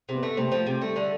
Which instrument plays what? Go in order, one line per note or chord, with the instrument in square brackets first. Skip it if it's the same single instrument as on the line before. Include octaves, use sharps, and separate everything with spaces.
[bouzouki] C3
[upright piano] B3
[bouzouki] A3
[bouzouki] C3 [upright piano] A3
[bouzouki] F3
C3
[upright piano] G3 [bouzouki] A3
[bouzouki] D3